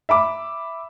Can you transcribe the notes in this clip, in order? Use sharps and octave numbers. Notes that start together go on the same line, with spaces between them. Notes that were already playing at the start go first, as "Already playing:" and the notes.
E5 B5 D6